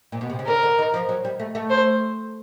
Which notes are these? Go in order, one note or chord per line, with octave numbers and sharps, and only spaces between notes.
A#2
B2
C3
C#3
D3 A#4
D3
D#3
F3
F#3
G3
A3
A3
C5